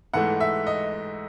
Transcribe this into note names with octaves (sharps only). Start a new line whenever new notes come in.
G#2 E3 A3 F#5
E5
D#5